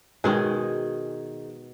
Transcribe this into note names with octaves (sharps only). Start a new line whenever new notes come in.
B2 D#3 G#3 G#4